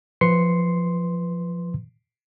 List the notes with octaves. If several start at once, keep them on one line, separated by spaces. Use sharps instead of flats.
F3 B4 C6 C7 C#7